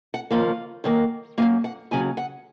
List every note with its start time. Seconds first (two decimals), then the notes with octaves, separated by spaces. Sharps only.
0.14 F#5
0.31 D#2 C#3 F3 A#3 F5
0.84 F#2 D#3 A#3
1.38 F#2 D#3 A#3 F5
1.64 F#5
1.91 D#2 C#3 F#3 G#5
2.17 F#5